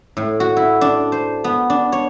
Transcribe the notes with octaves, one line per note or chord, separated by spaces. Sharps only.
A2
F#4
E4
D4
C5
B3
D4
C#5